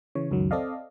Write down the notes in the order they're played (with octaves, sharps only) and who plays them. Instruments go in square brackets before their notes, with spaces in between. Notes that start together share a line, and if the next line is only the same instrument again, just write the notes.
[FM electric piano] C#3 E3 C#5
C#2 F#2 D#3 F#3
C4 A4 D5 D#5 F5